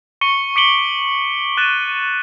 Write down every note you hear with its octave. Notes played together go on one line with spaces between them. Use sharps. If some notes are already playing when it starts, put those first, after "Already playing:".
C#6 C#7 G7
D6 B6 C#7 D7 F#7 G7
C#6 F#6 A6 D#7 E7